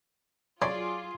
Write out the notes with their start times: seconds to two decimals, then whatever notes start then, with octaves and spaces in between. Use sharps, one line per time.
0.62 F#3 C#4 F4 G#4 D5 C6